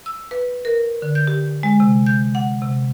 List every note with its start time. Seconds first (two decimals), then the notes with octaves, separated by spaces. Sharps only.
0.06 E6
0.31 B4
0.65 A#4
1.02 D3
1.15 G6
1.27 G4
1.63 G#3
1.80 C3
2.06 G6
2.35 F#5
2.62 C3